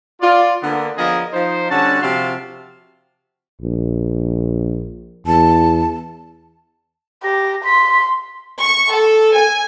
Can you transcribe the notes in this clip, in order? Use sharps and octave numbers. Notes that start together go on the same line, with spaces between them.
F4 D5
D3 A#3 B3
F3 B3 D4 G#4 A#4 D#5
F3 D#4 C5
D3 G3 C#4 F#4 A5
C3 F3 F#4 F5 A5 C6
A#1
E2 A5
G4 A#6
C6 B6
C#6
A4
G#5